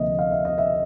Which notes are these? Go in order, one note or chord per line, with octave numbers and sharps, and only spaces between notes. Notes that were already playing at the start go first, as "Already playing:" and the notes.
Already playing: D2 C3 F3 A#3 D#5 E5
F5
E5
D#5
E5